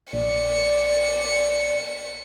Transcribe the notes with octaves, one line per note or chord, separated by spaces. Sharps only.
A#1 D5 C#7